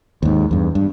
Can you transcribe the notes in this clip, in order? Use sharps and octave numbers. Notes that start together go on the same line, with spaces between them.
D#2 G#2
E2 G2
G2